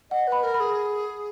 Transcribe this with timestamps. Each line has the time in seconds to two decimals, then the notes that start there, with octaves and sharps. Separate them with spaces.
0.11 D#5 F#5
0.27 B4 B5
0.43 A#4
0.54 B5
0.60 G#4